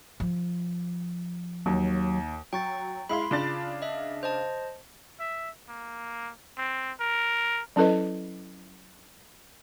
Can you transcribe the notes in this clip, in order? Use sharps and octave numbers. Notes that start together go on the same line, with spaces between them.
F3
D#2 F#3
F#3 G5 C#6 A6
G#3 E4 F5 B5 C6
C#3 D4 F4 B5 A6
D#5 E5
C5 D#5 A5
E5
A#3
C4
A#4
F#3 C#4 E4 A4 B4 D#5